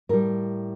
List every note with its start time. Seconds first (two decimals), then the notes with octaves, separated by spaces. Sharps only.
0.09 A2 G3 A#4